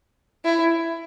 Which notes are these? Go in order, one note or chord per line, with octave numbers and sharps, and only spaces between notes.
E4